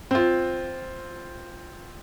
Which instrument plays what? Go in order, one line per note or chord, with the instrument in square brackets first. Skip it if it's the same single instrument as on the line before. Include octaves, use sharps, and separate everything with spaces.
[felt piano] C4 F4